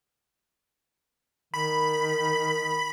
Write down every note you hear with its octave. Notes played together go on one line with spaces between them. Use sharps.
D#3 B5